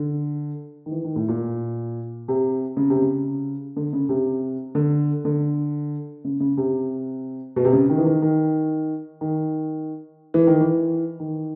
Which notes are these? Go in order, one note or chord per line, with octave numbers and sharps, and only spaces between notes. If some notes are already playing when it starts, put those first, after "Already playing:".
Already playing: D3
D#3
E3
D#3
A2
A#2
C3
C#3
C3
C#3
D3
C#3
C3
D3
D3
C#3
C#3
C3
B2
C3
C#3
D#3
E3
D#3
D#3
D#3
E3
D#3
E3
D#3